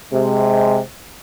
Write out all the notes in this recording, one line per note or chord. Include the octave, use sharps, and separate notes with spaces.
C3 G#3